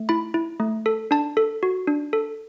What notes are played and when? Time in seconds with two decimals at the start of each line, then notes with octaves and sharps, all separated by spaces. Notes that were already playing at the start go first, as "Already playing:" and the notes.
Already playing: A3
0.09 E4 B5
0.34 E4
0.60 A3
0.86 A4
1.11 D4 A5
1.37 A4
1.63 F#4
1.87 D4
2.13 A4